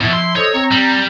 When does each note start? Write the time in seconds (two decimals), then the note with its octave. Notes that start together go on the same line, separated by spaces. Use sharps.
0.01 B2 F3 E4
0.13 C6
0.36 A4 C5 C#5 D#5
0.54 C4 A#5
0.71 G3